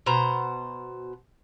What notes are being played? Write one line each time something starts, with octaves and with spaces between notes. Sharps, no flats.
B2 C5 A#5